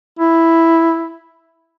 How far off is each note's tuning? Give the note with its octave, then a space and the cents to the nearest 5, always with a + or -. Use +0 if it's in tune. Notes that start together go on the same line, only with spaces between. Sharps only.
E4 +0